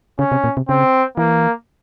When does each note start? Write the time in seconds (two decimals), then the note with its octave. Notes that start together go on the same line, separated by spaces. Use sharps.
0.19 C#3 C#4
0.32 C3
0.44 A#2
0.57 C3
0.69 C#3 C4
1.17 E3 A#3